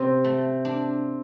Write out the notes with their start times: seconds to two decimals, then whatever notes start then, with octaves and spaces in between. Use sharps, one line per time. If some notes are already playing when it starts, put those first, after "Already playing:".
Already playing: C3 C4
0.24 A3
0.65 D4